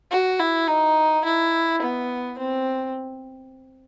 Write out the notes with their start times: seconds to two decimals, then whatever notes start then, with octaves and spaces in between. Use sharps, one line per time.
0.11 F#4
0.40 E4
0.68 D#4
1.24 E4
1.82 B3
2.38 C4